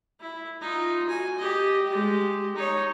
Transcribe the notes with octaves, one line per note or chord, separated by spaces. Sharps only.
E4
D#4 F4
F#4 G#5
G4 D#5
G#3 G4
D#4 C#5